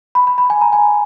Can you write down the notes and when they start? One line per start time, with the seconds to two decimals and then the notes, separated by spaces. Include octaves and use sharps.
0.15 B5
0.27 B5
0.38 B5
0.50 G#5
0.61 A#5
0.73 G#5